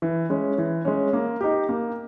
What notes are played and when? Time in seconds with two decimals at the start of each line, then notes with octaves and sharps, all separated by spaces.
0.02 E3
0.30 G#3 C#4
0.58 E3
0.85 G#3 C#4
1.13 A#3
1.41 D#4 G4
1.69 A#3